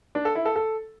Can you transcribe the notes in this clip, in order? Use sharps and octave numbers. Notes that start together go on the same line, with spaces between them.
D4
A4
E4
A4
A4